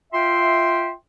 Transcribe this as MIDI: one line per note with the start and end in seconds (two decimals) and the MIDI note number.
0.13 0.93 65
0.13 0.93 76
0.13 0.93 79
0.13 0.93 84